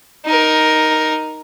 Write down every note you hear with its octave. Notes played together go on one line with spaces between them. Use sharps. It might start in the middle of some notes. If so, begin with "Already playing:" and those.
D#4 A#4